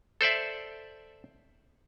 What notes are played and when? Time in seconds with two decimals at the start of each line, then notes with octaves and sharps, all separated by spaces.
0.21 A4 C5 D5 E5